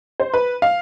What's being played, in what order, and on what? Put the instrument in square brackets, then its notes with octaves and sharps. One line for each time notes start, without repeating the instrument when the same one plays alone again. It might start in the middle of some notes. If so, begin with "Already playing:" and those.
[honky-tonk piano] C5
B4
F5